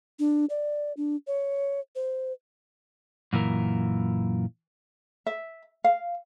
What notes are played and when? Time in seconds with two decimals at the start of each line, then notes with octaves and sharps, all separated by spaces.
0.19 D4
0.50 D5
0.97 D4
1.27 C#5
1.95 C5
3.33 F#2 A#2 E3 A#4
5.26 E5
5.84 F5